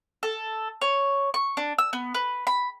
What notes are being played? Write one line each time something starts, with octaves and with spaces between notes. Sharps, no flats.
A4
C#5
C#6
D4
E6
B3
B4
B5